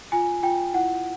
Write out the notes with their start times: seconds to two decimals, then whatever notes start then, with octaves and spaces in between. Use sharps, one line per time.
0.12 F4 G#5
0.43 F4 G5
0.73 E4 F#5